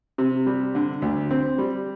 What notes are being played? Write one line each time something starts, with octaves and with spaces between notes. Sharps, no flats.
C3
G3
D3
D2
C4
G3